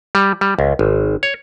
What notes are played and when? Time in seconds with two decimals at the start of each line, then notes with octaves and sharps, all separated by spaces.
0.15 G3
0.41 G3
0.59 C#2
0.79 G#1
1.23 C#5